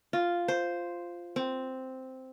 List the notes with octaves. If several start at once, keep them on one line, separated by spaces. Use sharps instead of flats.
F4
C5
C4